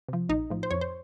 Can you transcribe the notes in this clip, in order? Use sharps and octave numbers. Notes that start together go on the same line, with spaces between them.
C3 F3
A#1 D#4
A2 F3
C5
F2 C#5
C5